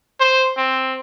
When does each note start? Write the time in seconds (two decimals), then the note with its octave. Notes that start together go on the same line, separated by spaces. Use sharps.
0.20 C5
0.57 C4